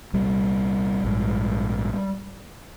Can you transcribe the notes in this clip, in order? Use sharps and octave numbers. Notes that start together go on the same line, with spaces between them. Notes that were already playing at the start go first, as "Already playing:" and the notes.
C2 A#2 G3
A#1 G#2